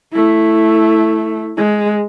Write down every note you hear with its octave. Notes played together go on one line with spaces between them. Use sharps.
A3 E4
G#3